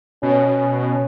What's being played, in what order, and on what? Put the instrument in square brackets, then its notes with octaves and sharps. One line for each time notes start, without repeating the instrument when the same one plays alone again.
[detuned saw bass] B2 [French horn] C#4